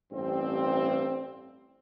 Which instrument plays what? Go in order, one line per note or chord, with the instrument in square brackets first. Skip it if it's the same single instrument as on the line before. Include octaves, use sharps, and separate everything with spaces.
[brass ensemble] A1 G2 C4